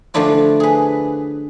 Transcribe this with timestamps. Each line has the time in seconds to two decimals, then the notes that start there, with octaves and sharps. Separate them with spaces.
0.14 D3 F3 A3 D4 E4 F4
0.60 G#4 B4